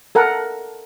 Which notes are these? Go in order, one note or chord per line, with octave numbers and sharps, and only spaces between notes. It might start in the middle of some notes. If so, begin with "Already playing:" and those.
A4 A#4 F#5